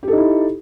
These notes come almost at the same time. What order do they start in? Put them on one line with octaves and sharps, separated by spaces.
G4 A4 D#4 E4